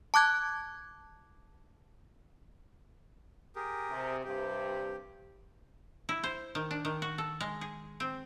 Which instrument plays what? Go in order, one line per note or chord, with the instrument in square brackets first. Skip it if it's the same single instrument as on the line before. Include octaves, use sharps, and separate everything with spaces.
[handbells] A5 D6 F#6 G#6
[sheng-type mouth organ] G4 G#4 A#4
[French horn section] C3
[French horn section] G2 C3 [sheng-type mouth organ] G4
[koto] E4
C5
D#3
D4
D#3
F#4
A4
G#3
G#4
C4